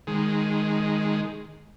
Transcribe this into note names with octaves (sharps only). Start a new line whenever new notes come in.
D#3 G#3